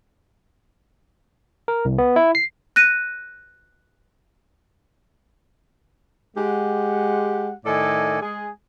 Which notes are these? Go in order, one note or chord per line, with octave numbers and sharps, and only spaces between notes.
A#4
C2
B3
E4
C7
F#6 A#6 D#7
G#3 G4 F#5
A2 D#3 A4 D5 D#5 G#5
G#3 G#4